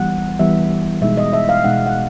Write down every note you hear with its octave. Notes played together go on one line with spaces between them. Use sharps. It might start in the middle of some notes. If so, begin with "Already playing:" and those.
Already playing: E3 G3 B3 F#5
E3 G3 B3 E5
B2 G#3 B3 D#4 E5
D#5
E5
F5
B2 G#3 B3 D#4 F#5
F#5